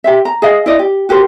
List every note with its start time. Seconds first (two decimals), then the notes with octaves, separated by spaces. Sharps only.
0.04 G4 C5 E5
0.25 A#5
0.42 G#4 D#5 F5
0.66 E4 C5 D5 D#5
0.79 G4
1.09 F#4 G4 A#4 C5